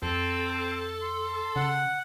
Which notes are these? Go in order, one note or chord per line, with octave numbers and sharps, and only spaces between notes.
F2 C4 A4
C6
C#3 F#5